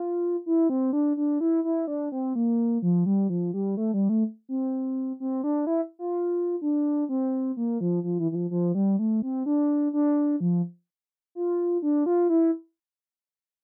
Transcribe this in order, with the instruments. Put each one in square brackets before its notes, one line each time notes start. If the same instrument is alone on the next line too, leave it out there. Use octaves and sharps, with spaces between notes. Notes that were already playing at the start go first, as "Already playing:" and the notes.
Already playing: [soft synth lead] F4
E4
C4
D4
D4
E4
E4
D4
C4
A#3
F3
G3
F3
G3
A3
G3
A3
C4
C4
D4
E4
F4
D4
C4
A#3
F3
F3
E3
E3
F3
F3
G3
A3
C4
D4
D4
F3
F4
D4
F4
E4